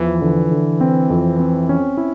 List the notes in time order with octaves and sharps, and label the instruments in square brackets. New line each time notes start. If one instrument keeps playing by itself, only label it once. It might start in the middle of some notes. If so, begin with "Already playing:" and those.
Already playing: [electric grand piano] E2 F3 [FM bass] E3
[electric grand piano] D3
D3
C4
F2
C4
C#4
E4